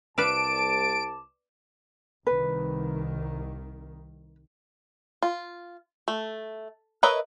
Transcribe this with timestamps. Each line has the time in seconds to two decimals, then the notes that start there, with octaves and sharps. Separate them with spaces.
0.18 C2 B4 D5 F5 A5 D6 D7 E7
2.27 C2 D#3 B4
5.22 F4
6.08 A3
7.03 A#4 B4 C#5 D#5 E5